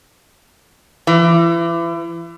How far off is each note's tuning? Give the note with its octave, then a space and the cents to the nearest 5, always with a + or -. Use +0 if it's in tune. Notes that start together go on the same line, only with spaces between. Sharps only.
E3 +35